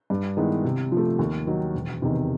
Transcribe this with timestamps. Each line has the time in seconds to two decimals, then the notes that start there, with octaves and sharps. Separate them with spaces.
0.10 G2
0.37 D#3 G#3 B3 E4
0.64 C3
0.92 F3
0.97 A3
1.19 D#2
1.47 D#3 F#3
1.74 E1
2.02 E2 C3 D#3